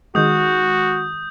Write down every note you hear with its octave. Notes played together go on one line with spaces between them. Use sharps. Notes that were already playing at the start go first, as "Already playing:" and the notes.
D#3 G#3 F#4 D#6 G6